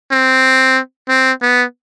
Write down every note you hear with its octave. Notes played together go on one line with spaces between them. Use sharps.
C4
C4
B3